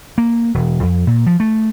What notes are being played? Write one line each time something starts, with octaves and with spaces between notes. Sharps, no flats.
A#3
E1
F2
A#2
F3
A3